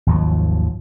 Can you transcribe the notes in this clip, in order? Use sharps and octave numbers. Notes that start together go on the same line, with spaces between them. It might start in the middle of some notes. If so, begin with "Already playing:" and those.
G#1 D#2 F3 F#3